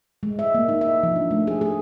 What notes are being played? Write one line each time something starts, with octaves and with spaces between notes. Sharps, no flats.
G#3
E5
A#3
D#4
E5
F3
D4
A3
G#4
G#4